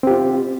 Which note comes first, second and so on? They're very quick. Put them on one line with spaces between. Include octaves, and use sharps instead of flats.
C4 G4 F4